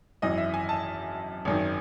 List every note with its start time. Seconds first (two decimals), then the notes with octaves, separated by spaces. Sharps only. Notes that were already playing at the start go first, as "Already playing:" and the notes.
0.22 G#1 F#2 E3 D#5
0.37 E5
0.54 G#5
0.69 A5
1.45 G#1 F#2 D#3